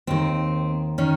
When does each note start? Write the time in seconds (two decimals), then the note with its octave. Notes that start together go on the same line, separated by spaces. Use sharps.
0.07 D#2 D#3 C4
0.98 D#3 C#4